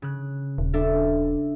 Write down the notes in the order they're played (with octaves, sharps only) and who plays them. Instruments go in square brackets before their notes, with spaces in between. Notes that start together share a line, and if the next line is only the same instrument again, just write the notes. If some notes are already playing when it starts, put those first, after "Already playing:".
[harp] C#3 F#6
[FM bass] D#1
[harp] D4 A4 E5